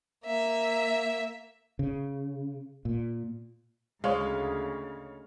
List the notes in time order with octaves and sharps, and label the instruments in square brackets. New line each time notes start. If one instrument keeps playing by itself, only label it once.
[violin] A#3 E5
[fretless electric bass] C#3
A#2
[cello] D2 C#3 [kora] G#3 [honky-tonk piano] C#5 F5